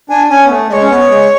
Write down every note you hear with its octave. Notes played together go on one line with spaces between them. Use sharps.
D4 G#5
C#4 G#5
B3
A3
G#3 C#5 D#5
C#4
B3
G#3